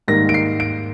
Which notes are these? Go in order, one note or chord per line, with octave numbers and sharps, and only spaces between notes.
G#2 D#3 G3 A#3 A#6
D7
C7
D7